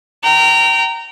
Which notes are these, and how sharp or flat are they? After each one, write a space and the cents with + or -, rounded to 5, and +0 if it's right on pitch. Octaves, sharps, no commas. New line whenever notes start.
G5 -30 A#5 -15